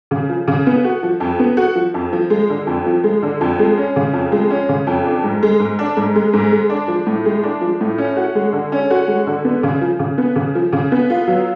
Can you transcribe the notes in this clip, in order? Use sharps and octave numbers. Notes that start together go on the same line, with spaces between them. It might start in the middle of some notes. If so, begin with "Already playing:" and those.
C#3
F3
C#3
B3
F#4
F3
F2
B3
F#4
F3
F2
F3
G#3
D3
F2
F3
G#3
D3
F2
G#3
C#4
C#3
F2
G#3
C#4
C#3
F2
D4
G#2
G#3
G#2
D4
G#2
G#3
G#2
G#3
D4
F3
A2
G#3
D4
F3
A2
C#4
F#4
G#3
D3
C#4
F#4
G#3
D3
B3
C#3
F3
C#3
B3
C#3
F3
C#3
B3
F4
F#3